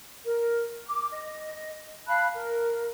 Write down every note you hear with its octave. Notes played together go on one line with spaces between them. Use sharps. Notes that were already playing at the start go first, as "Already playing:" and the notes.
A#4
D6
D#5
F5 A5 B5 F#6
A#4